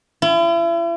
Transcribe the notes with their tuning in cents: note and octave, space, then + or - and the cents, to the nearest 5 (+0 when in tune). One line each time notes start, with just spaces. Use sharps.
E4 +40